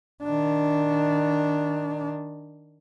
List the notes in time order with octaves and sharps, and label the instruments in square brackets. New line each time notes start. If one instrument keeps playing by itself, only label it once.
[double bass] D#3 D4